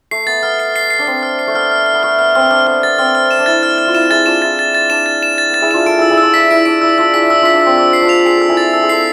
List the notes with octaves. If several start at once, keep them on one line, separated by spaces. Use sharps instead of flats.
A3 C7
B3 A6
B3 F6
C7
C7
C7
D4
C4 C7
F6
C7
A3
B3 F6
F6
F6
B3
A3 F6
B3 F6
C4 F6
D4 F6
B3 F6
B3 A6
C4 F6
F6
E7
D4
E4 A6
F6
F6
F4
E4 E7
E4 G#4 A6
D4 F4 E7
E4 A6
A6
A6
D4 E7
A6
E7
A6
B3 A6
E4 G#4
D4 F4 E7
F4 A4 D7
E4 G#4 E6
E4 G#4
D4 F4 E6
E4 B6
E4 D7
D4 D7
E4 E6
D4 F4 E6
E4 G#4 B6
E4 G#4 E6
D4 F4 B6
D4
C4 E6
D4 E6
C7
D4 F4
F7
G#4 C7
A4 E6
E4 G#4
A6
A4 E6
G#4
F4 A4 C7